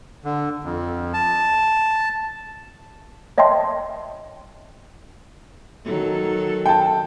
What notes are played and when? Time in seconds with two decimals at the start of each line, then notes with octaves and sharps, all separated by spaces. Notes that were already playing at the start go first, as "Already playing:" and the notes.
0.24 D3
0.65 F2
1.14 A5
3.38 C#5 D#5 E5 G5 A5 C6
5.84 D#3 F#3 A4
6.66 G5 A5